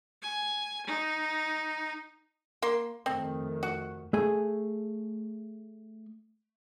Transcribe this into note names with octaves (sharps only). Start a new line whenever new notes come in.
G#5
D#4
A#3 C6
F2 D#3 A3 C4
F#4
A3 G#4 G#5